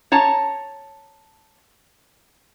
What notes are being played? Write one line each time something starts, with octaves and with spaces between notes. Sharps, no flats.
C#5 A5 A#5